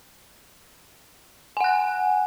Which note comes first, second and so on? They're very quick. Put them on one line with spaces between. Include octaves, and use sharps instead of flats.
G#5 F#5 F#6